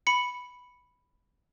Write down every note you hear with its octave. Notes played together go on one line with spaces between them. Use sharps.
B5 C#7